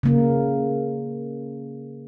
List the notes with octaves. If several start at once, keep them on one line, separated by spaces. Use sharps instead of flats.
C#3 A#3